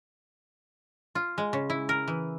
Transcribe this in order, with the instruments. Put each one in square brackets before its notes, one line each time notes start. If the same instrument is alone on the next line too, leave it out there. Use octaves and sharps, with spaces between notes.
[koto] F4
G#3
C#3
E4
A#4
E3